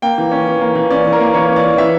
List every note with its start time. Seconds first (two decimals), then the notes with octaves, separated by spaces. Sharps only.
0.02 A#3 G5
0.18 E3
0.32 C#4
0.47 E3
0.61 A#3
0.75 E3
0.90 C#4 D5
1.05 E3
1.13 A#4
1.20 A#3
1.34 E3 C#5
1.49 C#4
1.56 D5
1.64 E3
1.78 E3 E5